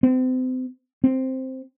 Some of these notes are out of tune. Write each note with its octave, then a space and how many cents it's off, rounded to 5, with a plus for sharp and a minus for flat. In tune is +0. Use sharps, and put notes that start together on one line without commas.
C4 -35
C4 +0